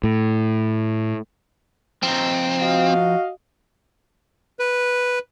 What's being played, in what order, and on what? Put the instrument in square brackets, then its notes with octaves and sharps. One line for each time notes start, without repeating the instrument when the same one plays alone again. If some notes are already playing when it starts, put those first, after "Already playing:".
[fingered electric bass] A2
[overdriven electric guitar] F3 D#4 [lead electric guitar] C4
[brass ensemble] F#4 D#5 F5
[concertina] B4